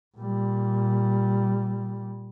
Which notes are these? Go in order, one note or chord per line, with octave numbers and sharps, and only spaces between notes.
A#2 G3